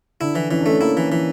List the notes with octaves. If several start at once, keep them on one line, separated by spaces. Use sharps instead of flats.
D3 D4 E4
E3
E3 C#4
D4
A3 C#4
A#3 E4
E3
E3